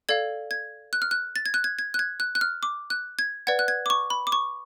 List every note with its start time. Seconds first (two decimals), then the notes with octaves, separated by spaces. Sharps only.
0.09 A4 D5 F5 G#6
0.51 G#6
0.93 F#6
1.02 F6
1.11 F#6
1.36 A6
1.46 G#6
1.54 F#6
1.64 G#6
1.79 G#6
1.94 F#6
1.99 G#6
2.20 F#6
2.35 F#6
2.41 F6
2.63 D6
2.90 F#6
3.19 G#6
3.47 B4 D5 F#5 G#6
3.59 F#6
3.68 G#6
3.86 D6
3.90 C#6
4.10 B5
4.27 D6
4.32 C#6